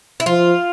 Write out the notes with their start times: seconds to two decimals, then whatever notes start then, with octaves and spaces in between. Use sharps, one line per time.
0.20 E4
0.26 F3 F4